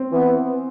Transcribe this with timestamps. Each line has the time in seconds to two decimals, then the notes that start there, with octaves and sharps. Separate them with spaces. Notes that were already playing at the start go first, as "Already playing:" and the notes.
Already playing: C4
0.12 E3 B3